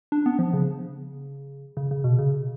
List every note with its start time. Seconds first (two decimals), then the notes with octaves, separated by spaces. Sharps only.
0.12 D4
0.26 B3
0.39 F3
0.53 C#3
1.77 C#3
1.91 C#3
2.04 B2
2.19 C#3